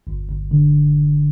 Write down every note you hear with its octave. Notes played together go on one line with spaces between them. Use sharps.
G1
G1
D3